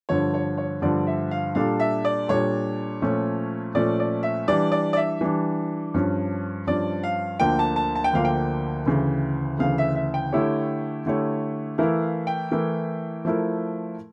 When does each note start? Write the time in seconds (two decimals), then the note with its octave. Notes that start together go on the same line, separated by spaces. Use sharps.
0.09 G2 D3 F3 C#5
0.34 C#5
0.58 C#5
0.82 G2 D3 F3 D5
1.07 E5
1.31 F5
1.55 A#2 G3 D4 A4 F5
1.80 E5
2.05 D5
2.28 A#2 G3 D4 A4 C#5
3.02 A#2 F3 A3 C#4
3.75 A#2 F3 A3 C#4 D5
4.00 D5
4.23 E5
4.48 E3 G3 D4 D5
4.72 D5
4.93 D5
4.97 E5
5.21 E3 G3 D4
5.94 G2 F3 C#4
6.67 G2 F3 C#4 D5
7.03 F5
7.40 D2 D3 F3 A#3 D4 G5
7.59 A5
7.76 A5
7.95 A5
8.04 G5
8.13 D2 D3 F3 A#3 D4 F5
8.25 G5
8.86 D2 C#3 E3
9.59 D2 C#3 E3 F5
9.78 E5
9.95 E5
10.14 G5
10.32 D3 A3 E4 G4 C#5
11.06 D3 A3 E4 G4 C#5
11.78 E3 A3 E4 A#4 F5
12.02 F5
12.27 G5
12.52 E3 A3 E4 A#4
13.25 F3 A3 E4 A#4